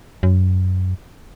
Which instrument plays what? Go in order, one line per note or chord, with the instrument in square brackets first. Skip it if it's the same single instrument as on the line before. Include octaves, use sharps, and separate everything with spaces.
[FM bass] F#2